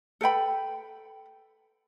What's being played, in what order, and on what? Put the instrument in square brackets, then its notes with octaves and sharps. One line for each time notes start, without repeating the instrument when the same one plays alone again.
[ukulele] A4 B4 G5 B5